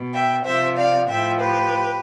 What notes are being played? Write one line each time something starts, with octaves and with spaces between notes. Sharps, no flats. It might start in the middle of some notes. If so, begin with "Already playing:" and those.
Already playing: B2
E5 G5
C3 F3 C5 E5
D5 F5
A2 F3 E5 G5
G4 B4